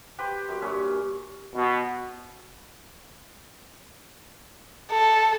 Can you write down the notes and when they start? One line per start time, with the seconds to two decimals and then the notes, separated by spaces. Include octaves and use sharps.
0.19 G4 B4 C5
0.49 F#2
0.62 G2 A#2 C#4
1.55 B2
4.92 A4